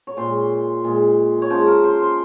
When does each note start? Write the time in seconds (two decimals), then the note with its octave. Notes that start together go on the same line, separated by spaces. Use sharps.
0.07 C#5
0.17 A#2 G#3 C5
0.84 A#2 G#3
1.42 C#5
1.50 C#3 F3 G#3 C5
1.66 A#4
1.84 C5
2.00 C5